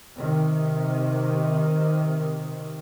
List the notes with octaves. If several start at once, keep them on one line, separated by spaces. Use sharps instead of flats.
C3 D#3